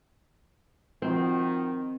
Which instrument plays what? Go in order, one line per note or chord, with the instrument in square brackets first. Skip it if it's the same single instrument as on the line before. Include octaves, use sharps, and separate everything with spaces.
[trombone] D#3 [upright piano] F3 F#4 [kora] C4